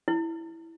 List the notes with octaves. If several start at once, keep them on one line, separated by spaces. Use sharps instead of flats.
E4